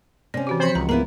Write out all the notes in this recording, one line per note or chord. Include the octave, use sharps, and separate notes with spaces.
C3 C#4 D5
E3 F#4 G4
F3 C4 C5 B5 C#7
C#2 A#5
A#3 B3 E4 A#5